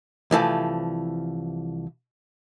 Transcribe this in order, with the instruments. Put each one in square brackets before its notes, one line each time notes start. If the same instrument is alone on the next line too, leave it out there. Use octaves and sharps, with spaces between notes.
[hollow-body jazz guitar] C2 E3 F3 A3